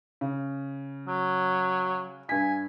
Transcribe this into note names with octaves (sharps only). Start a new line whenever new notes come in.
C#3
F#3
G2 G#5 B6